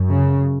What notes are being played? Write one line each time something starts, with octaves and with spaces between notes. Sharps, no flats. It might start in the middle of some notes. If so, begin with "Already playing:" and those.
Already playing: F#2
C#3